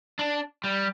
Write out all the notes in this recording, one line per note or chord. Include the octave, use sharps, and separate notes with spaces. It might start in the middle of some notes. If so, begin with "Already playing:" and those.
D4
G3